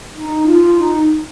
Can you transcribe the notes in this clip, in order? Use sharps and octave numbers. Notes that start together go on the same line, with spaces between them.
D#4
F4
D#4